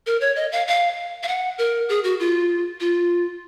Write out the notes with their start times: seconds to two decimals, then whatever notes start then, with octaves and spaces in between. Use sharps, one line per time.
0.06 A#4
0.21 C#5
0.36 D#5
0.52 F5
0.67 F5
1.23 F5
1.28 F#5
1.58 A#4
1.89 G#4
2.04 F#4
2.20 F4
2.80 F4